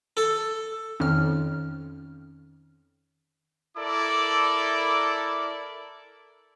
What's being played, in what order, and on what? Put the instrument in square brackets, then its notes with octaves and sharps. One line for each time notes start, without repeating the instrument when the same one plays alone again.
[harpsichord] A4
[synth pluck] F2 F6 [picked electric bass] D#3 C#4
[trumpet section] E4 A4 A#4 D5 D6